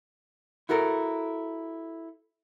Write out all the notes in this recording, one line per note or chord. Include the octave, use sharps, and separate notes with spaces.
E4 F#4 A4 A#4